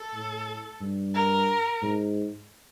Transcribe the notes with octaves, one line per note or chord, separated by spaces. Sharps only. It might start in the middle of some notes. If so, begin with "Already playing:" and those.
Already playing: A4
A2
G2
A#4
G#2